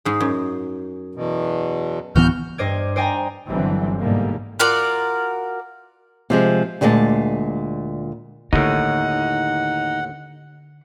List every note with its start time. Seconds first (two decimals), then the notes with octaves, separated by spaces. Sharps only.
0.05 G#2 G#3
0.20 F#2
1.15 E2 B2
2.16 D1 E3 B3 F#4 F6 G6
2.58 G2 C5 D#5 D6 G#6
2.96 C5 D5 D#5 G5 G#5 A#5
3.48 G1 D3 E3 F#3 G3 C4
4.01 G#2 B2 D3 E3 G3 A#3
4.59 F4 F#4 A#4 D5
6.30 C3 F3 G#3
6.81 D2 A#2 G#3 A#3 A5
8.53 D#2 A2 D3 D#4 F#5